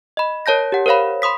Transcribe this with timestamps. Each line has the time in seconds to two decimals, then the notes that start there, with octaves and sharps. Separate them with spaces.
0.17 D#5 B5
0.46 A#4 C#5 A5 G6 A#6
0.72 G4 F#5
0.86 A#4 C5 C#5 F5 B5
1.22 B5 C6 D#6 B6